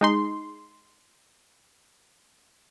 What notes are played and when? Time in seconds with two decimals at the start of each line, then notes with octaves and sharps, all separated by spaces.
0.01 G#3 D#4 C6